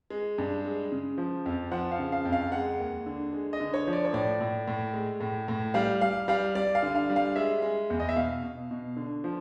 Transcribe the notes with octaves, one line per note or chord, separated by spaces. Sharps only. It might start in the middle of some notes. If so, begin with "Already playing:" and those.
G#3
G2
G#3
C#3
F3
F2
F3 F#5
F5
C#3
F5
F2
F5
G#3 F#5
D#2
D3
G#3
D#5
D3
C#5
F3
D5
C#5
A2 D5
A2
A2
G#3
A2
A2
G3 F5
G3 F5
G3 F5
G3 D5
F5
D3
F5
G3
F5
G#3 E5
G#3
E2
D#5
E5
B2 F5
B2
B2
D3
F3